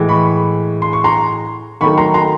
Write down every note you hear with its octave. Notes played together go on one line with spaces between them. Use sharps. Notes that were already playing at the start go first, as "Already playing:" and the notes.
Already playing: A2 E3 G#3
B5 C#6
C6
C#6
A#5 C6
D#3 F#3 A3 B5 C#6
A#5 C6
A#5 C6